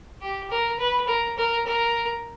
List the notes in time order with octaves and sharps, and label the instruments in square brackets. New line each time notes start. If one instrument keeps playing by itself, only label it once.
[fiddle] G4
A#4
B4
A#4
A#4
A#4